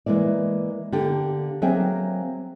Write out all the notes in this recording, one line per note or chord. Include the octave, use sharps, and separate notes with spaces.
E3 G#3 A#3 E4 D5
D3 A#3 G4
F#3 A#3 C4 G#4 E5 G5